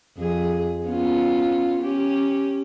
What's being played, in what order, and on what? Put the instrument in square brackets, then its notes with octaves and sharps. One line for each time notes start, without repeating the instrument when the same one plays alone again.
[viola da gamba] F2 G#4
B3 C#4 F4
C#4 G4